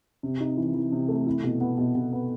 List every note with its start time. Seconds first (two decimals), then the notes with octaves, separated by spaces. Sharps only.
0.23 C3
0.41 D#4
0.57 E3
0.74 E3
0.92 C3
1.09 A3
1.27 E4
1.44 B2
1.61 B3
1.78 B2
1.95 B2
2.13 B3